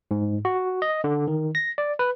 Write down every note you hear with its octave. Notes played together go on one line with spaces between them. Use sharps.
G#2
F#4
D#5
D3
D#3
A#6
D5
B4